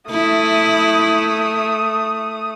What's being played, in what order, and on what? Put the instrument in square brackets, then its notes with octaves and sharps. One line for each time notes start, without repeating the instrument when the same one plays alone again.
[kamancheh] A3 D#6 [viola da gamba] E4